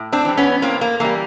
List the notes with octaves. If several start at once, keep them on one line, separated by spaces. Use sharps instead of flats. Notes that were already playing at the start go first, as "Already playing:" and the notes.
Already playing: A2
C4 D4
E3 G3
B3 C#4
A2 A#3 C4
A#3
E3 G3 A#3